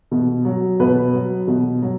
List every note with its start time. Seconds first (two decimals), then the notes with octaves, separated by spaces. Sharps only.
0.11 B2
0.45 F#3
0.80 B2 B4
1.13 F#3
1.48 B2
1.82 F#3